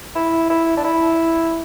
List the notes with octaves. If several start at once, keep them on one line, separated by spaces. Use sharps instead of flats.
E4
E4
D4
E4